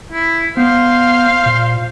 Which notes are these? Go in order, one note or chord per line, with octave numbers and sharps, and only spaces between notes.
E4
B3 C5 F5
A#2